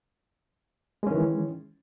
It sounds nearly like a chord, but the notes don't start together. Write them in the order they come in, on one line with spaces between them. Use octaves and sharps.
G#3 C#4 D#3 E3